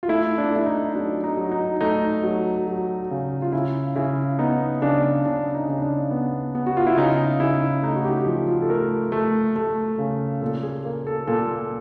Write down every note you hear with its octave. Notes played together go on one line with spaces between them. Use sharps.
F4
A3 E4
D4
A3 E4
D#4
F#3 D4
D#4
F#3
D#4
A3 D#4
F#3
F#3
C#3
F4
C#3 E4
C#3 E4
B3 D#4
C#3 D4
C#3 D4
D#4
C#3
D4
B3
B3
F#4
F4
E4
C#3 D#4
C#3 E4
A3 D#4
F#4
G4
F3 F#4
F4
A4
A3 A#4
A3
A3
C#3
A#2 A4
G#4
A#3
A4
A#2 A4